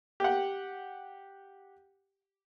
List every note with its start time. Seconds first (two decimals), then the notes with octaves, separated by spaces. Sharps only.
0.20 G4 F#5